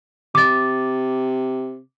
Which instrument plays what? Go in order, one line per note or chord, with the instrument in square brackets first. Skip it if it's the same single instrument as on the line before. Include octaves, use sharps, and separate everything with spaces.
[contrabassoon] C3 [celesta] D6 A6